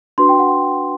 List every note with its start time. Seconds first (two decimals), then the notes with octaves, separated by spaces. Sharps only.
0.18 D4 F#4 B4 C6
0.29 G5
0.39 F#5